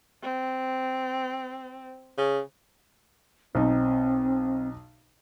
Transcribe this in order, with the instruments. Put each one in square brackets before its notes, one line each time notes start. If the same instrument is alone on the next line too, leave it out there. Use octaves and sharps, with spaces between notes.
[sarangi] C4
[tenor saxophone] C#3
[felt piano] B1 D#4 [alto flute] C4